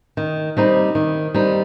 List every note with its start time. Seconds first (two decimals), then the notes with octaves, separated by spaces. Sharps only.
0.17 D#3
0.57 G3 C4 D#4
0.95 D#3
1.34 G3 C4 D#4